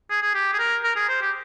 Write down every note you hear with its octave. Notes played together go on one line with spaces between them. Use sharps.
G#4
G#4
G4
G#4
A#4
A#4
G#4
C5
G4